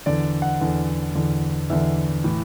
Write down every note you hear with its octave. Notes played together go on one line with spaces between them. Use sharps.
E2 D3 D5
F#5
E2 D3
E2 D3
E2 D3 E5
A2 E3